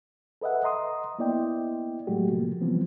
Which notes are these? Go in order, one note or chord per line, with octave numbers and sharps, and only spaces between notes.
A4 B4 D#5 E5 F#5
D#5 A#5 C6 D#6
A#3 B3 E4 D5 D#5 G5
A2 F#3 G#3 A3 F#4 G4
C3 F3 A#3
E3 F3 G3 B3 C4